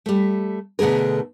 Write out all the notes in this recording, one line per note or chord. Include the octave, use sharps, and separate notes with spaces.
G3 A3
B2 D3 A3 G#4 A#4